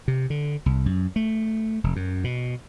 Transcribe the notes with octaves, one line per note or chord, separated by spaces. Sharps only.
C3
D3
C2
F#2
A3
F1
F#2
B2